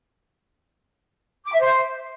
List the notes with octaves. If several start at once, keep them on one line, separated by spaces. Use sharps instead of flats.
D6
E5
C5